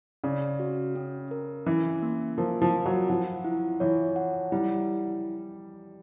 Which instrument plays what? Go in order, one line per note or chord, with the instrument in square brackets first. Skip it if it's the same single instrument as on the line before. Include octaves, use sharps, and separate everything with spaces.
[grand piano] C#3 [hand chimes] D5
[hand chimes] F#4
C#4
A#4
[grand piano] E3 [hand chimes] C#4
[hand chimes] A#3
[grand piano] F3 [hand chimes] A#4
[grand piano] F3
[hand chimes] F4
[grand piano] F#3
[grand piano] F3 [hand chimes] F#5
[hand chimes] E4
[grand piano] E3 [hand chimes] C#5
[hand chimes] F#5
[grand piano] G3 [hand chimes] E4